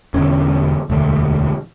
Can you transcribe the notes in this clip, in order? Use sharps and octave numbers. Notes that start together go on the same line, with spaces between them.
E1 E2 D3 C#4
E1 D2 D3